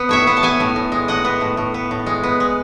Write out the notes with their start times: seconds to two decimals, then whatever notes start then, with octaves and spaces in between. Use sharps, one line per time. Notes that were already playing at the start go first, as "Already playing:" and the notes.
Already playing: B3
0.09 A2 C#5 E5
0.27 B3
0.37 A5
0.43 B3 E5 G#5
0.60 A2
0.76 A2
0.92 G#3
1.08 A2 D#5 F#5
1.25 B3
1.41 A2
1.57 A2
1.74 B3
1.91 A2
2.06 G#3
2.23 B3
2.40 G#3